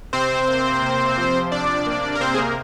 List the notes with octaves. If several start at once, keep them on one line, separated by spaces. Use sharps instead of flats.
C3 C4 C5
A#3
C3
F3
C3 D4 D5
A#3
A#4
C3 C4 C5
G#4
A#3 A#4